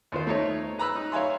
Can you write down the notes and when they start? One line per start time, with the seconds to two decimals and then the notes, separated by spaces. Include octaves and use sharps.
0.12 D#2 F4 C5
0.27 A3 D#4 C#5
0.78 B4 A#5 B5 E6 F#6
0.96 D#4
1.12 C#5 E5 F5 G#5 C6